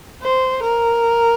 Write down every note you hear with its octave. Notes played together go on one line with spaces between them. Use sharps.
C5
A#4